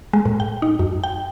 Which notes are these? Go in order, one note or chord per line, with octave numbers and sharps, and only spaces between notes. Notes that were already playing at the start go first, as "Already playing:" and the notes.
G#3
A2
G5
D#4
F#2
G5